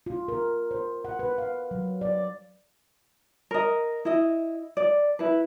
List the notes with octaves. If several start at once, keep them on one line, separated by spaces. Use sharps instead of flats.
F4
A#4
C5
F#5
B4
F5
F#3
D5
A#4 D#5
E4 D#5
D5
E4 B4